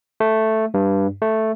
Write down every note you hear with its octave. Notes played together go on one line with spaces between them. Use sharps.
A3
G2
A3